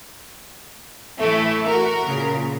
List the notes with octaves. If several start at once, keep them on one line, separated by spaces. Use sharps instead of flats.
A2 E3 A3 E4
F#4 A#4
A#2 C#3